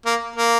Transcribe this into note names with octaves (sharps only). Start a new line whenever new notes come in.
A#3
A#3